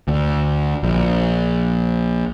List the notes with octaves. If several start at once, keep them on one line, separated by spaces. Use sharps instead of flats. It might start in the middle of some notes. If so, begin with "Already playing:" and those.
D2
A#1